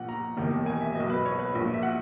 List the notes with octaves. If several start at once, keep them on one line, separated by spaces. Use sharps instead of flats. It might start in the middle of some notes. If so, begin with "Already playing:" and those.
Already playing: A#1 A#2 F#5
A#5
E1 D#2 D#3
G#5
E5
B1 B2 D#5
B4
C#5
B4
A#1 A#2
E5
F#5